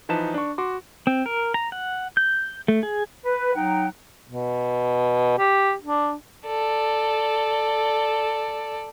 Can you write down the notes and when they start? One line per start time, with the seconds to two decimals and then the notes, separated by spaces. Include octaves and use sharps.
0.09 E3 F3 D#4 B4 A5 E7
0.34 D4 C#6
0.58 F#4 C6 D6
1.07 C4
1.26 A#4
1.54 A#5
1.72 F#5
2.17 G6
2.68 A3
2.83 G#4
3.24 B4
3.55 F#3 D#4 F#5 G5
4.27 B2
5.38 G4
5.82 D4
6.47 A4 D5